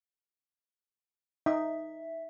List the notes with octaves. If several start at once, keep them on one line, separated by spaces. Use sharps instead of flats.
D#4 E5